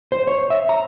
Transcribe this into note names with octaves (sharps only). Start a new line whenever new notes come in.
C5
C#5
E5
A#5